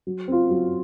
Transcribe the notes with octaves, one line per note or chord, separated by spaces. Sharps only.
F#3
C4 F4
F#3